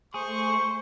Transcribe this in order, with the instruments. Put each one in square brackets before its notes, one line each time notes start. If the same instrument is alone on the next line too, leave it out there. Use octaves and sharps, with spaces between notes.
[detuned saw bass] A3 [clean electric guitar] G#4 [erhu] C5 [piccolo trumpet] C#6